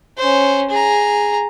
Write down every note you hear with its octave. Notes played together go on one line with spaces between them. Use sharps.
C#4 C5
G#4 A#5